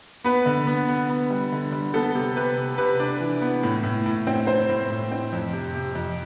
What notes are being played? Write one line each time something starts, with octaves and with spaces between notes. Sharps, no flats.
B3 B4
D3
B3
B3
B3
G3
D3
G3
B3 A4
C3
C3 B4
C3
C3 B4
D4
E3
B3
A2
A2
A2
C4
C4 C5
A2
A2
C4
F2
C3
C3
F2